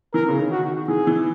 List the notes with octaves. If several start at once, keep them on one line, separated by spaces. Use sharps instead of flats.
E3 A#4
C#3
D#3
F#4
D#3
E3 G#4
E3